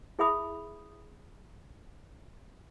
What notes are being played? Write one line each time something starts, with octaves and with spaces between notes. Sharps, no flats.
E4 G#4 E5 B5 D#6